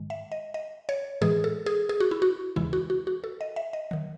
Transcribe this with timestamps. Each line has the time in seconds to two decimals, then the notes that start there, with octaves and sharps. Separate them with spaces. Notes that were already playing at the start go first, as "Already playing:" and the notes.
Already playing: G#2 D#3 G#3
0.10 E5
0.32 D#5
0.54 D#5
0.89 C#5
1.21 A2 E3 G#3 G#4
1.44 A4
1.66 G#4
1.89 G#4
2.00 F#4
2.11 E4
2.22 F#4
2.56 D#2 C#3 E3 G#3 E4
2.73 F#4
2.90 F#4
3.07 F#4
3.24 A4
3.41 D#5
3.56 E5
3.73 D#5
3.91 D#3 F#3